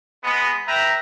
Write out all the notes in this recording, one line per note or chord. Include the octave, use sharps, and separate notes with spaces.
G#3 B3
B4 E5 G5 A#5